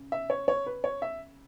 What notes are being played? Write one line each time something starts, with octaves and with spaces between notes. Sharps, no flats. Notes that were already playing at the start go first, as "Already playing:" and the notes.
Already playing: C#3
E5
C#5
C#5
B4
C#5
E5